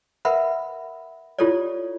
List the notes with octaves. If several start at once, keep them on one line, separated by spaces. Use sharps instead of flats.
A#4 B4 E5 F#5 B5
E4 F4 G4 A4 C#5 D5